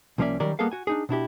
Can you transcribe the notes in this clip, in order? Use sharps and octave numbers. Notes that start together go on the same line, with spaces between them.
C2 F3 A#3 C#4 D5 E5
D#3 F#3 G3 C#4 A#4 D5
G3 A#3 B3 G#4 A4 F5
F#4 G#5
D4 D#4 G#4
B2 D4 E4 G4